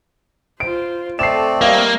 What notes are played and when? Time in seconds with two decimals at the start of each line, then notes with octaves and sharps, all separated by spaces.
0.60 F4 C5 D7
1.19 A3 C4 A4 D5 D#5 C7 E7
1.61 G3 A#3 D#5 F5